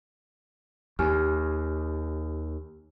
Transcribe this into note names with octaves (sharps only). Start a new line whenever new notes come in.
D#2 G4 G#5 F6